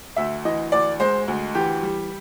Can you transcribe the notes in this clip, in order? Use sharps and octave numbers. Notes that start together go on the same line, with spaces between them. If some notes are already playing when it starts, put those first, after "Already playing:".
D2 E5
E3 D#5
D2 D5
G#3 C5
D2
E3 G4
G3